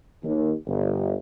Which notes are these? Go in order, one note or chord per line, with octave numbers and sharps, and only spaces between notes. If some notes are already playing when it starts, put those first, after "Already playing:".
D#2
G1